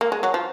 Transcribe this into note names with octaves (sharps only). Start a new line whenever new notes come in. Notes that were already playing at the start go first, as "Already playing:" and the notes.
A#3
G#3
F#3
F3